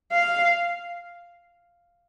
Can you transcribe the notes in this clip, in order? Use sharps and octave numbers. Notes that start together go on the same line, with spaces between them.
F5